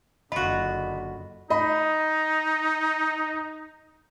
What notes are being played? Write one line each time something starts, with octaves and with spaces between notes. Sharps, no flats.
F#1 D3 F4 F#4 D#5 B5
D#4 D#5 B5